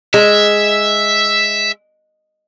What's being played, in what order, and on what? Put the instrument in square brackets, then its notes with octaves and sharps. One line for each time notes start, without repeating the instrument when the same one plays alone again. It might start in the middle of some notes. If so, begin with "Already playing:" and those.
[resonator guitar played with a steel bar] G#3 [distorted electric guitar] E5